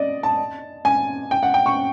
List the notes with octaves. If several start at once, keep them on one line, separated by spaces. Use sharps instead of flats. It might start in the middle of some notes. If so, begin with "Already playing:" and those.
Already playing: D5 D#5
A5
G#5
G5
F#5
G5
C#6